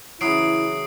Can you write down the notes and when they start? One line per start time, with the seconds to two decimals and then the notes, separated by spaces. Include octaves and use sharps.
0.21 C#3 E3 F#3 E4 D#6 C7 D7